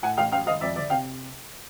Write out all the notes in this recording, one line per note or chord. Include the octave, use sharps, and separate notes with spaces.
A2 F#5 G#5
A1 F5 G5
F#2 F5 G5
G#1 D#5 F5
F2 D5 E5
G1 D5 E5
C3 F5 G5